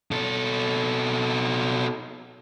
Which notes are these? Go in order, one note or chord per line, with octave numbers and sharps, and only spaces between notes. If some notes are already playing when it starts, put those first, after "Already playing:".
B2 A4